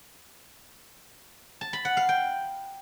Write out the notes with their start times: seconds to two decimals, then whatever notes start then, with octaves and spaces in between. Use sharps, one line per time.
1.61 A5
1.73 B5
1.85 F#5
1.97 F5
2.09 G5